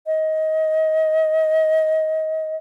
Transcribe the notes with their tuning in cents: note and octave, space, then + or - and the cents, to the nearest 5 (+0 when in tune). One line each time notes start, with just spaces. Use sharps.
D#5 +25